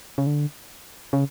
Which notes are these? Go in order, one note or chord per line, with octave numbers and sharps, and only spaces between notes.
C#3
D3
C#3